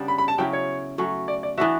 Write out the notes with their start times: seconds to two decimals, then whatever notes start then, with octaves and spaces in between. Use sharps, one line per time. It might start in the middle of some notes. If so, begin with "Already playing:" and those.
Already playing: C#3 G3 B3 D4
0.08 B5
0.18 B5
0.28 A5
0.38 C#3 F#3 C#4 E4 G5
0.53 C#5
0.98 F#3 A3 C#4
1.28 D5
1.43 D5
1.57 E3 B3 D4 F#4 E5